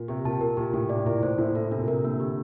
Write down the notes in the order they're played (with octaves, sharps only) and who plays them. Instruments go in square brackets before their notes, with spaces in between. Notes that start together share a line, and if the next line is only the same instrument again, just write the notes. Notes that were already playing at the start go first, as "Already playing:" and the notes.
Already playing: [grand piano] A#2
[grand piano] C3 [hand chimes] G4
[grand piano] A#2 [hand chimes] A5
[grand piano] A#2 [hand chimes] A#4
[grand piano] A#2 [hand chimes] G4
[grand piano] A2 [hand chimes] G4
[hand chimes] D5
[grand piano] A2
[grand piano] A#2 [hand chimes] E4
[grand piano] A2 [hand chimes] C5
[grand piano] A2 [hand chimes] A#3
[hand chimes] A4
[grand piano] C3 [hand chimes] D4
[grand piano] A#2
[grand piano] C3 [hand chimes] A#4
[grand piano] D3 [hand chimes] A#3
[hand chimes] G4